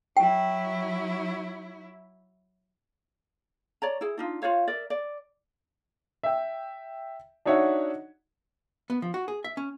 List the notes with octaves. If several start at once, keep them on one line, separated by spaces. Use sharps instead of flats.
F#3 E4 G5
C#5 D5 A#5
E4 G#4
D4 D#4 F4
F4 C5 C#5 F5
A#4 D5 E5
D5
E5 G5
D4 D#4 F#4 C#5 E5 F#5
B3
F3
F#4
G#4
E5
C#4